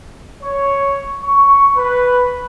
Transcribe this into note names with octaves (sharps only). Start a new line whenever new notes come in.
C#5
C#6
B4